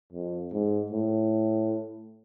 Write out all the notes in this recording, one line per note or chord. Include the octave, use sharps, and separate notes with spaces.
F2
G#2
A2